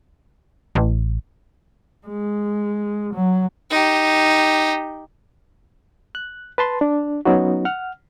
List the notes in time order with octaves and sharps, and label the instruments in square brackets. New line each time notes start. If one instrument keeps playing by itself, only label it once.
[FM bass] A1
[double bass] G#3
F#3
[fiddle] D#4 G4
[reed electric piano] F#6
B4 A5 C6
D4
F#3 B3 C#4 D#4 F#4
F#5 F6